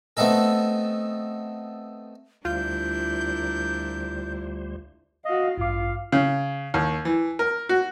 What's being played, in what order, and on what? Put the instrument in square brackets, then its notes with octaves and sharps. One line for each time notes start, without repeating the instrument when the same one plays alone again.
[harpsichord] A3 B3 C4 D#4 A4
[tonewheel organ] D2 G3 C5 [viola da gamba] D4 E4 A#4 [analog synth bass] F4 [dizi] G6
[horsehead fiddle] F#4 F5 [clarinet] D#5
[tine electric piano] A1 G2 D6 [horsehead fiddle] F4 [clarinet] F5
[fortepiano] C#3
D#2
E3
A#4
F#4